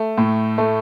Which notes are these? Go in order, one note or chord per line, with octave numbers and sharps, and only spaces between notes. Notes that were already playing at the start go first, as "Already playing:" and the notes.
Already playing: A3
A2
A3